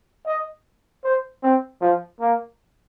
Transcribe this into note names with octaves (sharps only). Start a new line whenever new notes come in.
D#5
C5
C4
F3
A#3